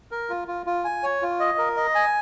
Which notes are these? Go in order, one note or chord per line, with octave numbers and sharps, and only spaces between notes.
A#4
F4
F4
F4
G#5
C#5
F4
D#5
A#4
D#5
G#5